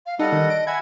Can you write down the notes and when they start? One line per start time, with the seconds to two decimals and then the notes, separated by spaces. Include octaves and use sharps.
0.06 F5
0.19 G3 D#4 A4 D#5 F#5
0.32 D#3
0.50 D7
0.67 E5 F#5 G#5 B5 G#6